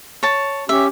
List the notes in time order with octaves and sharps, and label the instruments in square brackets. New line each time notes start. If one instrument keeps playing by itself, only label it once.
[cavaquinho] C#5 A5
[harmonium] C#4 G4 [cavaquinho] E5